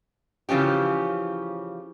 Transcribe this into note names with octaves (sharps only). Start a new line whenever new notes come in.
C#3 E3 F3 C#4 G4